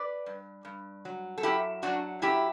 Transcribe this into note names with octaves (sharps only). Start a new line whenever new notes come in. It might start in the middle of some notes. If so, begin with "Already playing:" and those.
Already playing: B4 D5
G2
G2
F#3
A4
F#2 E4 G4
F#3 D4 F#4
F#2 E4 G4